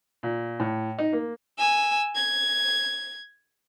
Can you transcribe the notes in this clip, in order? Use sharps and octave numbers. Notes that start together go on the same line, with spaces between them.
A#2
A2
D#4
A#3
G#5 E6
G#6